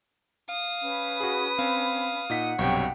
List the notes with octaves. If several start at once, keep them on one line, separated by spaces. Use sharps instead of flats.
F5 D#6
C#4 B4 B5
F#4 G#4
C4 F5
A#2 D#4 F#5 B6
B1 G2 C3 C#5 G5